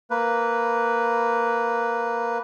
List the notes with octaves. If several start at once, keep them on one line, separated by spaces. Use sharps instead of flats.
A#3 B4